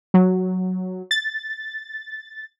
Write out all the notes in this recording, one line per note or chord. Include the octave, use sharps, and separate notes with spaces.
F#3
A6